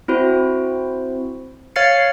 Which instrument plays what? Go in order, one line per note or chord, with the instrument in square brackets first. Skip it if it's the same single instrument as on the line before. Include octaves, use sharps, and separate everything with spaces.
[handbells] C4 E4 F#4 C5
C#5 F5 F6 A6 C7 C#7